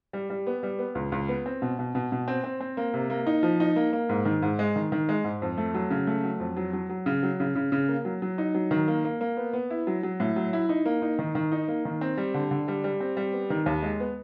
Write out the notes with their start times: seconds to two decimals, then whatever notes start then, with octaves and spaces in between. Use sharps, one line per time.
0.13 G3
0.30 G3
0.47 B3
0.63 G3
0.79 B3
0.95 C#2
1.12 C#2
1.29 B3
1.46 C4
1.62 B2
1.79 B2
1.95 B2
2.12 B2
2.28 C4
2.44 C4
2.60 C4
2.77 A#3
2.94 C3
3.10 A#3
3.26 D#4
3.43 F3
3.60 D#4
3.76 A#3
3.93 A#3
4.09 G#2
4.25 D#3
4.42 G#2
4.59 G#3
4.76 D#3
4.92 D#3
5.09 G#3
5.24 G#2
5.42 F2
5.58 A3
5.75 F#3
5.90 C#3
6.07 A3
6.24 F#3
6.40 F2
6.57 F#3
6.73 F#3
6.90 F#3
7.06 C#3
7.23 F#3
7.40 C#3
7.55 C#3
7.72 C#3
7.89 A#3
8.05 F#3
8.22 F#3
8.38 D#4
8.55 F#3
8.71 D#3
8.88 A#3
9.05 A#3
9.21 A#3
9.37 B3
9.53 B3
9.70 E4
9.87 F#3
10.03 F#3
10.20 A2
10.36 F#3
10.53 E4
10.69 D#4
10.85 A#3
11.02 D#4
11.19 D#3
11.35 D#3
11.52 D#4
11.68 A#3
11.85 D#3
12.01 C4
12.17 G3
12.34 D3
12.51 D3
12.68 G3
12.84 G3
13.00 C4
13.17 G3
13.33 B3
13.50 D#3
13.66 D#2
13.83 G#3
14.00 B3